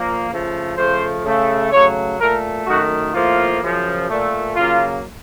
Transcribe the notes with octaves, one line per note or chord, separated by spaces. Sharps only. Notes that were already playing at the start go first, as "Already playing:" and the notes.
Already playing: A#2 F3 A#3
C#3 F3 A3
C#3 F3 A3 C5
C#3 A3
C#3 F#3 A3 C#5
A#2 A3 A#4
F#2 D#3 A3 F#4
A2 F3 A#3 F4
F#2 C#3 F3
A#2 A3
C#3 F#3 A#3 F4